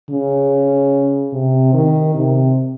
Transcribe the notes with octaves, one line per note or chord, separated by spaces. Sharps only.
C#3
C3
D#3
C3